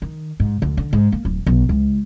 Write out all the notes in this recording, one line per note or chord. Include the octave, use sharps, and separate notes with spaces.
D#3
G#2
D2
D3
G#2
A#3
D1
B1
C#2